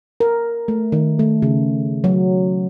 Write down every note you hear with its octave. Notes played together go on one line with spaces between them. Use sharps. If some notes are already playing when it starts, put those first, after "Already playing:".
A#4
A3
D#3
A3
C#3
F#3